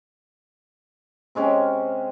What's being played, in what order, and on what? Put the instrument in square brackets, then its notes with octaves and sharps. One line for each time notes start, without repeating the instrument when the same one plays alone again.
[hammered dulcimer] C3 G#3 C#4 G4